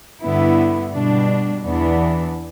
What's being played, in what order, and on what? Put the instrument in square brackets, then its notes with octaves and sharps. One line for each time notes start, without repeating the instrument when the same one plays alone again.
[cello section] G2 D3 B3 E4
B2 G3 D4
E2 E3 B3 D4